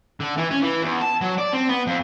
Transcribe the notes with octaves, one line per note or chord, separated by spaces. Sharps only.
D3
E3
C#4
E3
E2
A5
F#3
D5
C4
B3
F2